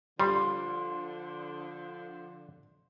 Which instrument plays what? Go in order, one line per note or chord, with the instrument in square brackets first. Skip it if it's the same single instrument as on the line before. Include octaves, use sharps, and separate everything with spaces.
[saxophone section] D3 F3 [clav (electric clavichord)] G3 [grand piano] C6